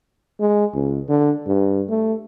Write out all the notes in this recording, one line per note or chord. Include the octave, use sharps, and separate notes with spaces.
G#3
C#2
D3
G2
A3